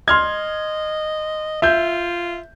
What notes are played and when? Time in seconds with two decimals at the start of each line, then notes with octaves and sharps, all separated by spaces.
0.08 D#5 C6 F6 G#6
1.62 F4 E5 G6